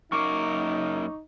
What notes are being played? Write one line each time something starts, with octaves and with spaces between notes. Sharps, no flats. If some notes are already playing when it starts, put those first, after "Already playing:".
F#2 A#3 D#4 A#4 C#6 D6